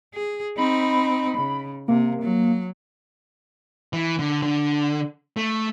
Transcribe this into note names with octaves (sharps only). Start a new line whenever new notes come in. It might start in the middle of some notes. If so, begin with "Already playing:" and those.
G#4
C4 D#4 B5
C#3
C3 A#3
F#3
E3
D3
D3
A3